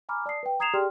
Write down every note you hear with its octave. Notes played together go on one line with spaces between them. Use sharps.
G#5 A#5 B5 D6 F6
D5 A5 D#6 C7
B4 G5
A#5 D#6 G#6 C7 E7 F7
G4 G#4 D5 G5 C6 F6